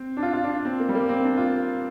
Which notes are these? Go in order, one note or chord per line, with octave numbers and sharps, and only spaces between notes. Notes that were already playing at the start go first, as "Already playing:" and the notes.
Already playing: C4
D4
F4
F4
D4
C4
A#3
G3
A#3
C4
D4
F4